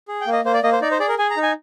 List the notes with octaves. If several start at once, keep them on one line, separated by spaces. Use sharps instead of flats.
G#4
G5
A#3
D#5
A#3 C5
D5
A#3 D#5
C5
D#4 D5
C5
G#4 D5
A#4
G#4 G#5
A#5
D#4
G#5